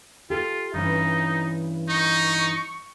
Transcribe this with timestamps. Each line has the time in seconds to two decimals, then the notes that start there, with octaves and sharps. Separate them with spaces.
0.30 F4 G4 A4
0.74 G2 E3 C#4 D#4
1.89 D#4 C#6